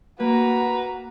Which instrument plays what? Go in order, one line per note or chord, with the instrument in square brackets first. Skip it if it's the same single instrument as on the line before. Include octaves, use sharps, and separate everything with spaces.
[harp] A#3 [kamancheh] F#4 A#5 [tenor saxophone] B4